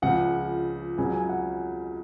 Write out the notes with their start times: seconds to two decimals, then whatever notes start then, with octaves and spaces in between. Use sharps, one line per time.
0.02 C#2 C#3 F3 F#5
0.98 C#2 C#3 F#3 G#5
1.14 G#5
1.29 F#5